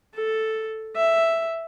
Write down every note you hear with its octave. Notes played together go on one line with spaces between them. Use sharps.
A4
E5